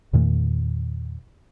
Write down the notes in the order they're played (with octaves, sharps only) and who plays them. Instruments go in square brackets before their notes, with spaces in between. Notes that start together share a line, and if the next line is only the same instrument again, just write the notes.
[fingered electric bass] E2 A#2 D#3 A3